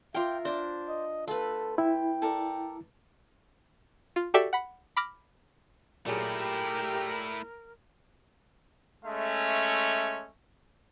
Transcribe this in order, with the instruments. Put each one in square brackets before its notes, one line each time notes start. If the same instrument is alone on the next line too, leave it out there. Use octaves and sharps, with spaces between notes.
[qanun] F4 A#4 [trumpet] E5 [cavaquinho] G5 C6 D6
[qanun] D4 [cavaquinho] C5 D5
[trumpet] D#5
[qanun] A3 B4 [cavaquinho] F4 [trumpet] A4
[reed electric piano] E4 [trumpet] G5
[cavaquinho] A4 A#4 D5
[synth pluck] F4
F#4 G4 A4 D5 E5
F#5 B5
B5 D6 F6 A#6
[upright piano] A#2 F#3 G#4 [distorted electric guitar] A3 E4 [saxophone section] G4 [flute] A#4
[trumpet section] G#3 A3 C#4 E5